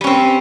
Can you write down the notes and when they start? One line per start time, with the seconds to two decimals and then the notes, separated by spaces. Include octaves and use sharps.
0.01 G3
0.04 C#4
0.07 C4